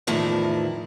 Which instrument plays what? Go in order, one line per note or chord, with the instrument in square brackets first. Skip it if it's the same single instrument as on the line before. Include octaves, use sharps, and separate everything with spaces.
[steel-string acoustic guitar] E2 A2 D#3 F3 E4